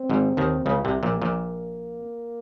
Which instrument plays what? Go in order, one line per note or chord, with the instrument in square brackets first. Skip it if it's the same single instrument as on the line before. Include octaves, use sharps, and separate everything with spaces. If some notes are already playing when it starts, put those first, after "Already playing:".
Already playing: [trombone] C4
[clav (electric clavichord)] G#1 G#2
D#2 D#3
C#2 C#3
C2 C3
A#1 A#2
[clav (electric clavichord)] A#1 A#2 [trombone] A#3